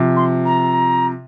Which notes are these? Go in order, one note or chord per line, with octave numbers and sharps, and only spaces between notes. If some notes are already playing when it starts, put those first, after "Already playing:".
Already playing: C3 F3
C6
A#5